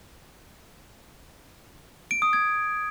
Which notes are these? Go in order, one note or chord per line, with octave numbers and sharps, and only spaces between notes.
D7
D#6
G#6